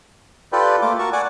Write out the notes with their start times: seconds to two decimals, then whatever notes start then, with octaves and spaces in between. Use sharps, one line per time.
0.52 F4 G4 A4 B4 D5 G5
0.82 A3 A#3 F4 D6
0.99 F#4 A#4 A5 C#6
1.13 D5 F#5 G#5 D6